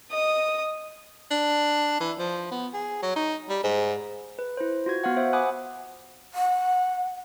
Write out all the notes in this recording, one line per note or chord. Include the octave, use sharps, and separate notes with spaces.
D#5 D#6
D4
E3
F3
B3
G#4
F#3
D#4
G3
G#2
B4
E4 C5
F4 F#4 G#6
B3 F#4 F5 F#5
C5 E5
F#5 G#5 B5 D6 D#6 F#6
F#5